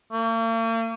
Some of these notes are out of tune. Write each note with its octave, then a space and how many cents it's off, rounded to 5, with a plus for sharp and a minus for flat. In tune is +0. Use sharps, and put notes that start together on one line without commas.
A#3 -45